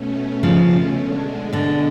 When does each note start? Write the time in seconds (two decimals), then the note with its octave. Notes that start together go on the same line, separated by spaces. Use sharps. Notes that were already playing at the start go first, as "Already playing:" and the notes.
Already playing: B2 A3 C#4
0.43 C#3 F3
0.97 D3 G#3 D4
1.53 B2 D3